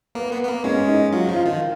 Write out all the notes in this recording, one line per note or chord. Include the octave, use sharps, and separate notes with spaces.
A#3 B3
B3
B3
A#3
G#3 C#4
D#4
F#3 F4
F3
F4
D#3